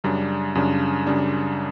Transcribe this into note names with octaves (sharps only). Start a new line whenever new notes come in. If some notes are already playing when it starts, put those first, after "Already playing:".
F#2 C#3 G3 D4
F#2 C#3 G3 D4
F#2 C#3 G3 D4